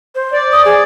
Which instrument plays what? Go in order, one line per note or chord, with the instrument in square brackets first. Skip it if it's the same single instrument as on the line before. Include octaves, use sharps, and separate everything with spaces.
[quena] C5
[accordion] D5
[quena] D#6
G#4